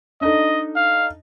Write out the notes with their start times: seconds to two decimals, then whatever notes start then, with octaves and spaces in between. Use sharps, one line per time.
0.21 D4 D#4 A4 D#5
0.76 F5